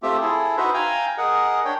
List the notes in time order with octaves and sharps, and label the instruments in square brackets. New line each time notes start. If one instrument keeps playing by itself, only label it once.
[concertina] A3 C4 F4 G4 E5
E4 G#4 A4
D#4 F#4 B4 C5 D#5 E5
F5 G5 G#5 A#5
G#4 A#4 D#5 F#5
D4 C#5 G5